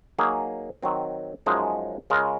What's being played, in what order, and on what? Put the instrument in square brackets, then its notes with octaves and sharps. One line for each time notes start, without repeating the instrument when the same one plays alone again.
[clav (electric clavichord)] F#3 A#3 D#4 G#4
D#3 F#3 C4
F#2 F3 G#3 D#4 G#4
C#3 G#3 C#4 F4 A#4